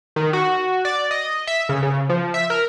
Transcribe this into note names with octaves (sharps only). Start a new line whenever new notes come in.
D#3
F#4
D5
D#5
E5
C#3
C#3
F3
E5
A#4